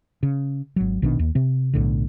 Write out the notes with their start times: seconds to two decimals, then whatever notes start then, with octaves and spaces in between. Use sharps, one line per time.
0.23 C#3
0.76 G#1 F#3
1.02 A#1 B2 D#3 D4
1.19 D#2
1.35 C3 C4
1.74 B1 A2 D3